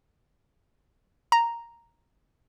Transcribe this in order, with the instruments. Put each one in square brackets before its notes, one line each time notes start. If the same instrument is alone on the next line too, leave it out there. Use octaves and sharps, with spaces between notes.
[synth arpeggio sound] A#5